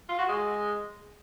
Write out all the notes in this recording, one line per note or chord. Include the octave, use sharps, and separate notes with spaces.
F4
F#4
G#3